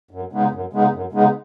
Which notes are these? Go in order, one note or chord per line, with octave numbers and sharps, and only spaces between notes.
F#2
C#3 G#3 B3 D#4
F#2
C#3 G#3 B3 D#4
F#2
C#3 G#3 B3 D#4